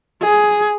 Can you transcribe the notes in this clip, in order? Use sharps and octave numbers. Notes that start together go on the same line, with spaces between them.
G#4